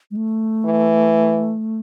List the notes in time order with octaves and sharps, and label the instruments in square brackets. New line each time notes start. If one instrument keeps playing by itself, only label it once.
[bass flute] G#3
A3
[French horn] E3